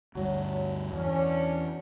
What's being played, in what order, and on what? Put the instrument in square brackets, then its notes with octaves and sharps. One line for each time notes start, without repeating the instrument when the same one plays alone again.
[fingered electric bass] D2 G2 [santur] F#3
[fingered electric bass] E2 [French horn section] C#4 D4